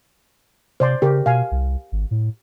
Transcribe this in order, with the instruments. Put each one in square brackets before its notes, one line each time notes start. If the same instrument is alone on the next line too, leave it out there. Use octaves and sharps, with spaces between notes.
[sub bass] C3 [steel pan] C5 D5 C6
[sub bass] C#3 [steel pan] G4 A#4
[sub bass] B2 [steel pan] F5 G#5
[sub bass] C2
G#1
A2